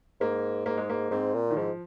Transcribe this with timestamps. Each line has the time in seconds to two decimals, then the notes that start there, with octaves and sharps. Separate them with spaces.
0.20 G#2 A#3
0.66 G#2 A#3
0.77 G#3
0.90 A#3
1.11 G#2 C4
1.34 A#2
1.50 D#3
1.57 G#2 F3